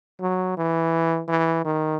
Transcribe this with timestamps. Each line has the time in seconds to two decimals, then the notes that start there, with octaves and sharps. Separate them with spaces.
0.21 F#3
0.57 E3
1.28 E3
1.65 D#3